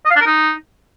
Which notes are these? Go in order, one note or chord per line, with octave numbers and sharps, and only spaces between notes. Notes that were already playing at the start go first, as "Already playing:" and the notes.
D#5
F5
D4
A#4
D#4